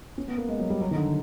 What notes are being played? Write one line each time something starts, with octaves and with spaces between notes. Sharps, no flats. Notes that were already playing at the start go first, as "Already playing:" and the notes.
C#4
B3
A#3
G#3
F#3
G3
F#3
D#3
D3